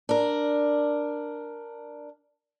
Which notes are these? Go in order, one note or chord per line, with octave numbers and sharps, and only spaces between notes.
D4 A#4